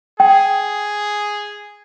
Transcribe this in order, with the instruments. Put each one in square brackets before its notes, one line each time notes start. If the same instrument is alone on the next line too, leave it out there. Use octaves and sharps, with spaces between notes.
[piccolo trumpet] G#4 [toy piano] G5